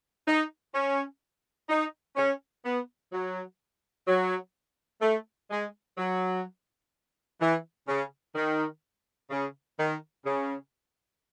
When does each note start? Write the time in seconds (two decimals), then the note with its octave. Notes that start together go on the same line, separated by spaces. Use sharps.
0.27 D#4
0.74 C#4
1.69 D#4
2.16 C#4
2.64 B3
3.12 F#3
4.07 F#3
5.01 A3
5.50 G#3
5.97 F#3
7.40 E3
7.87 C#3
8.35 D#3
9.30 C#3
9.78 D#3
10.25 C#3